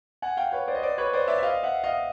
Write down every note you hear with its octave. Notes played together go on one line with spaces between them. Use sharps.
F#5 G#5
F5 G5
B4 C#5
C5 D5
D#5
C5 D5
B4 C#5
C5 D5
D5 E5
E5
D#5 F5
E5 F#5
D#5 F5